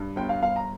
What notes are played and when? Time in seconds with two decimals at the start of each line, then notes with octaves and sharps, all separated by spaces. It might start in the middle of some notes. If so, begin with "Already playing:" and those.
Already playing: G2
0.16 G1 G5
0.29 F5
0.42 G1 F5
0.56 A#5